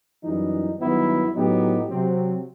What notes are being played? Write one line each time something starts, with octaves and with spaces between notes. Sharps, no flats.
F#2 E3 G3 D#4
G2 D#3 F#3 B3 E4
A2 F#3 B3 D#4 G4
C3 F#3 C4